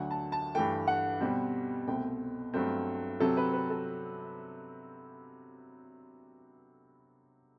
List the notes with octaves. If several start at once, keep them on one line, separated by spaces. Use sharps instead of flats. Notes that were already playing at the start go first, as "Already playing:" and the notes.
Already playing: D2 D3 F#3 F#5
A5
A5
G2 E3 A3 G5
F#5
B2 G3 C4
C2 B2 A3 C4 G5
G2 F#3 A3 C4
C3 F#3 C4 A4
B4
B4
A4